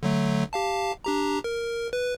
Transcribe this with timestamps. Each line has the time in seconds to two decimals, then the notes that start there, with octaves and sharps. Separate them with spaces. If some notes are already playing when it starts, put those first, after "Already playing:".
0.03 D3 F#3 A3
0.53 G4 F5 A5
1.04 D4 G4 A#5
1.44 A#4
1.93 B4